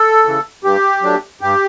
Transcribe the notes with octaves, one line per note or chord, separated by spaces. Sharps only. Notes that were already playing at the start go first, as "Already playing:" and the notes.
Already playing: A4
C#3 E3
G2 G4
F#3 A3 D4
G2 G4